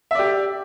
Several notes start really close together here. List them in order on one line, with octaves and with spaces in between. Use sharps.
E5 D5 G4